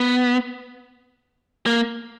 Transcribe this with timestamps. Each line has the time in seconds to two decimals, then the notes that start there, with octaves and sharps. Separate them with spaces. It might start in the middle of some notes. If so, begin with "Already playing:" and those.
Already playing: B3
1.66 A#3